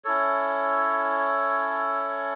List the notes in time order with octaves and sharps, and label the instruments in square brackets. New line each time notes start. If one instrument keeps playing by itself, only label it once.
[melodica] C#4 E4 A4 C#5